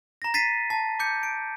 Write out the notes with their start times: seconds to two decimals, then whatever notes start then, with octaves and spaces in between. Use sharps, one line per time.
0.22 A#5 A#6
0.34 A6 B6 C7 D#7
0.70 A5
0.99 D6 G6 C#7
1.23 D7